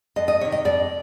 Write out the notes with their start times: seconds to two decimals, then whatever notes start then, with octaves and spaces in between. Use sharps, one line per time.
0.16 F2 D#5
0.28 D#5
0.41 C3 C#5
0.45 D#3
0.52 D#5
0.65 F2 D5